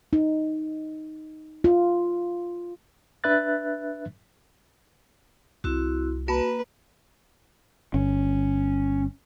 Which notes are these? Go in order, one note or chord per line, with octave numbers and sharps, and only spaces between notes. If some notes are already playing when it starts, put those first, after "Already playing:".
D#4
F4
D4 B4 E5 F#6 A6
C2 C4 E4 F#4
A#3 F#4 B4 A5 B5
G1 C#4